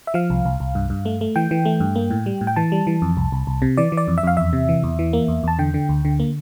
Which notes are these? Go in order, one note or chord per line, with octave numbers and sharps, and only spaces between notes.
E5
F3 F5
C2
C2
C2
G2
G2
A3
A3
E3 G5
E3
A3
G2
A#3
A2
G3
A2
G5
E3 A5
G3
E3
F2
C2
C2
C2
C3
E3 D5
E3
D5
F2
E5
F2 F5
E2 E5
C3
E3
E2
E3
A#3
E2
E2 A5
D3 G5
D3
D2
D3
A#3